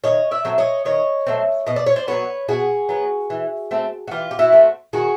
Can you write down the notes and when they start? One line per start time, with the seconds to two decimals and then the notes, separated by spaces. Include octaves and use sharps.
0.04 D#3 C#5 D#5
0.31 D5 E5
0.45 F#3 A3 C4
0.58 C#5 D#5
0.85 D#3 C#5 D#5
1.27 F#3 A3 C4
1.67 B2 D#5
1.76 D5
1.86 C#5
1.96 C5 D5
2.07 F#3 B3 B4 C#5
2.48 B2 F#4 G#4
2.89 F#3 B3
3.30 E3
3.71 A3 C4
4.08 F#4
4.11 E3 F4 G4
4.31 G4
4.39 E4 F#4
4.52 A3 C4
4.93 D#3 F#4 G#4